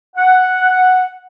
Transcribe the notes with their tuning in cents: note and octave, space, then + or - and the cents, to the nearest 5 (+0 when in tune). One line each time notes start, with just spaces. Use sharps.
F#5 +0